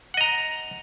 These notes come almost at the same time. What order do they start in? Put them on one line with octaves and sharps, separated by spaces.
F#5 D#5 A#5